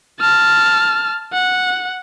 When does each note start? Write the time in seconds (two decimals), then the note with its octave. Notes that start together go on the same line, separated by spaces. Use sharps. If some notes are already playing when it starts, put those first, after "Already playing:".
0.20 A5 F6
1.33 F#5